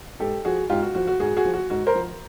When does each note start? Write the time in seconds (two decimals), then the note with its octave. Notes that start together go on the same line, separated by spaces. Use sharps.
0.20 G#2 G4 A4
0.45 F3 F#4 G#4
0.70 G#2 F4 G4
0.82 F#4
0.95 F3 F#4
1.07 F#4
1.20 G#2 F#4 G#4
1.37 F#4 G#4
1.45 F3
1.53 F#4
1.70 G#2 F#4
1.87 A#4 C5
1.95 F3